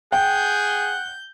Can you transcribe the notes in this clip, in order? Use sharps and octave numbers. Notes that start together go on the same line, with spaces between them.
G#4 F#5 G5 G6